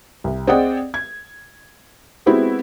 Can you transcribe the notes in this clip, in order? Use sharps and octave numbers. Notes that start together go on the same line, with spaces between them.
C2
C4 G#4 D5 D#5 F#5 G5
G#6
G#3 B3 C4 E4 F#4 G4